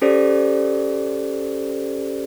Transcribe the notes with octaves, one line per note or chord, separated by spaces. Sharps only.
C#4 G4 A4 C5 D5